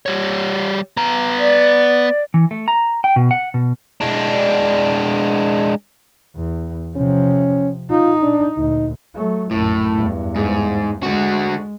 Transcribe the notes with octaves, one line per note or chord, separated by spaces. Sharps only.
G3 C#5
B3 A#5
D5
E3
A3
A#5
G5
B2
F#5
B2
G#3 D4
E2
C3 F3 C#4
D#4 F4
D4
D2 A#2 D#4
F#3 A3
A#1 F#2 A2
E2 G2
G#2
D3 G#3 F#4